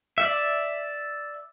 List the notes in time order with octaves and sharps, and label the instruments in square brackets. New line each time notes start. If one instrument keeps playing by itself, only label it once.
[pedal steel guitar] D5 E5